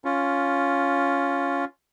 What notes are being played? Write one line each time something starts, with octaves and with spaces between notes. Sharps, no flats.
C#4 F4